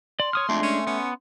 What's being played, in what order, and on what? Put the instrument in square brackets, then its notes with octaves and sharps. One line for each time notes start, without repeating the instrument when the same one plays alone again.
[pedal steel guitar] D5 [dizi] C6
[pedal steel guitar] C#5 D#6 F6
[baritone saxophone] F2 [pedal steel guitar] G#3 D4 [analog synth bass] A3
[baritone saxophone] C#4
[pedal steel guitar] B3 [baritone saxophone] C#4